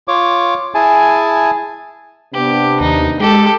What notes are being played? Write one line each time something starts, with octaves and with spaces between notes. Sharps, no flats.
F4 C#5 D6
E4 G#4 G#5 A5
C3 B3 D4 G4
D#2 D#4
G#3 G4 A4